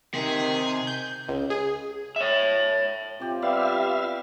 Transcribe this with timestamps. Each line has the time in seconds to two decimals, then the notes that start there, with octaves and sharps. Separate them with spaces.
0.14 C3 D#3 G#4
0.87 G6
1.29 C#2
1.50 G#4
2.16 C#5 E5
3.20 C3 F4 G4
3.43 G3 B3 E5 F5